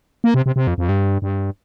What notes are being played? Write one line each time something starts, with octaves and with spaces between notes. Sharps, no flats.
A#3
C3
C3
C3
F2
F2
G2
G2